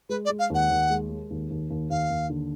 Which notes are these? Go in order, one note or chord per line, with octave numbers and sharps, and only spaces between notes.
G#3 B4
D5
G#3
F5
D#2 F#5
D#2
G#3
G#3
D#2
D#2
D#2
D#2 F5
D#2
D3